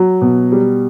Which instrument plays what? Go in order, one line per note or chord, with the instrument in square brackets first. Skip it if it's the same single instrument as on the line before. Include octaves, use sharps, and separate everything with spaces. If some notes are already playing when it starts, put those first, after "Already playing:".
Already playing: [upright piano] F#3
B2
G3